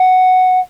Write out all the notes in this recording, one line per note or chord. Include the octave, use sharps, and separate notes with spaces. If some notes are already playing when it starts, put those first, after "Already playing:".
Already playing: F#5